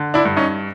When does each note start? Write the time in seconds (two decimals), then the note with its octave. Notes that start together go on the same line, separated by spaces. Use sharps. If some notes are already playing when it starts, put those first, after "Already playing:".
Already playing: D3
0.14 D4 E4
0.25 G2
0.36 C#4 D#4